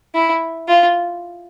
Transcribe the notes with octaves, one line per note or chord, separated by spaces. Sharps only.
E4
F4